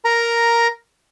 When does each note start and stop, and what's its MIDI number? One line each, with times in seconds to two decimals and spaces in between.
0.05 0.68 70
0.05 0.68 82